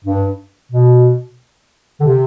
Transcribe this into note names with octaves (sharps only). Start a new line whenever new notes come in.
G2
B2
D3
C3